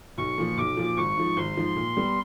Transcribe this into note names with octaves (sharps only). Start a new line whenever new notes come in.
B1 C#6
A#2 F3
B1 D6
A#2 F3
G#1 C#6
G#2 F3
G#1 C6
G#2 F3
A#2
G3 B3